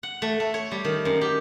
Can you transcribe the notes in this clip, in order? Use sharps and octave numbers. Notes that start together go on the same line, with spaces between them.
F#5
A3
A3
C#5
G3
D#3
F#2
G4